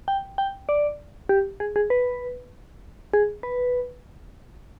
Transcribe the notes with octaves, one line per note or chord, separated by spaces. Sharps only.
G5
G5
D5
G4
G#4
G#4
B4
G#4
B4